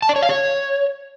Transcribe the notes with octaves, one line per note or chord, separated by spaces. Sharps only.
A5
D5
C#5
F5
C#5